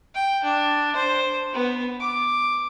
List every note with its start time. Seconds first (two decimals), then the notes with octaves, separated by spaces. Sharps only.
0.15 G5
0.43 D4
0.96 C5
1.53 B3
2.00 D6